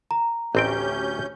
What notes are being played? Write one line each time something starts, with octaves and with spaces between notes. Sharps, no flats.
A#5
A1 D2 C4 C#4 G4 G5 G6